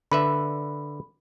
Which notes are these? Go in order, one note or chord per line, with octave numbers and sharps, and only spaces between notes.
D3 B4 E5 B5